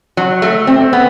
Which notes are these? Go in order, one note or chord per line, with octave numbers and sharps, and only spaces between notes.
F#3
A3
C4
B3